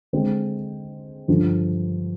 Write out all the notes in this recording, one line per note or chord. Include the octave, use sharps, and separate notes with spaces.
D3 G#3 C4
G2 D3 F3